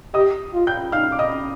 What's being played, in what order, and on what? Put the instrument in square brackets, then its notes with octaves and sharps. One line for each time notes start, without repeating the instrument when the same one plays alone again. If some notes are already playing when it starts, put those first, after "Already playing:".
[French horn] G4 [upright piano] D#5 D#6
[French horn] F4
[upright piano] G5 G6
[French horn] D#4 [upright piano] F5 F6
[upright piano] D6
D#5 D#6